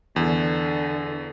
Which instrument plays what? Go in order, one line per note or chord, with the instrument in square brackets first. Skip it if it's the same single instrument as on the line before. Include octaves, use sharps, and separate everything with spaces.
[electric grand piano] E2 [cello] D3